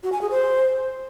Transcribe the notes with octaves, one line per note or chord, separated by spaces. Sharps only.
F#4
G#5
G#4
C5